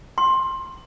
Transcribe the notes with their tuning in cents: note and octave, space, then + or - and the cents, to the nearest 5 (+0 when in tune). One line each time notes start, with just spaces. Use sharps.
C6 +15